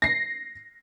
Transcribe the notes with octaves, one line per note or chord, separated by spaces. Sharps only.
A#6 C7